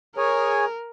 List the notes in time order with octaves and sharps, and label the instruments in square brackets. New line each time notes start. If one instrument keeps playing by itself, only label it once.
[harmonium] G#4 C#5 G#5 [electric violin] A#4